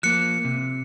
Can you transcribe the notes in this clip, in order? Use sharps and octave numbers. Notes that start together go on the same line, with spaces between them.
F3 A#3 F#6 C#7
C3